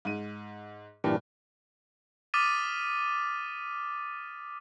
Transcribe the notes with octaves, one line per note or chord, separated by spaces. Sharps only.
G#2 D#7
G2 A#2 E3 D4 G4
D6 D#6 F6 A6 B6 D#7